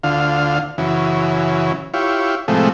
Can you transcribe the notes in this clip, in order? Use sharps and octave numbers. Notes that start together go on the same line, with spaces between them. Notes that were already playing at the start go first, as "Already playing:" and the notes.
D2 D3 F4 F5
F#2 C#3 E3
E4 F4 G4 C#5
A2 C3 F3 G#3 A3